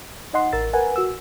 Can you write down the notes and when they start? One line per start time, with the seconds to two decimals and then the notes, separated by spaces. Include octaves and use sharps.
0.33 D#4 D#5 F#5 C6
0.53 A1 A#4 E6 A6
0.73 A#4 B4 F#5 G#5
0.96 F#4 E6